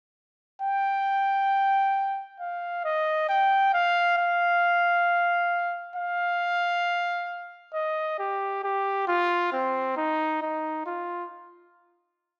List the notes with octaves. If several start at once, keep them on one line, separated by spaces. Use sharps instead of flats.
G5
F5
D#5
G5
F5
F5
F5
D#5
G4
G4
F4
C4
D#4
D#4
F4